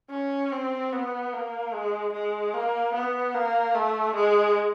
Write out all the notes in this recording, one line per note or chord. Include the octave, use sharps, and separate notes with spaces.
C#4
C4
B3
A#3
G#3
G#3
A#3
B3
A#3
A3
G#3